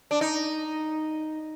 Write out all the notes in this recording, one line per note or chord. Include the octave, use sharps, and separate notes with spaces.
D4
D#4